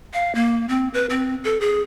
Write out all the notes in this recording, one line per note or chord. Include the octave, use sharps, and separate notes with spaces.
F5
A#3
C4
B4
C4
A4
G#4